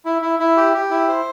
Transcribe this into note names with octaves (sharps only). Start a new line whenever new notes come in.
E4
E4
E4
G4
G4
E4
C5